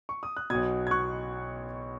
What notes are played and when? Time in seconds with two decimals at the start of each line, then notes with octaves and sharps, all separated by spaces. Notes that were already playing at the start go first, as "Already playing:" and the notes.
0.09 C#6
0.23 D#6
0.37 F#6
0.50 B1 B2 D#6 G#6
0.87 G#6
0.91 C#6 F#6